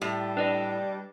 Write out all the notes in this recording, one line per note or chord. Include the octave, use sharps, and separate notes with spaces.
A2 G3
D4 B4 D5 D#5